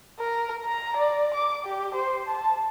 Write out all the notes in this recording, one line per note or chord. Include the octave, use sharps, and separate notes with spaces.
A#4
A#5
D5
D6
G4
C5
A5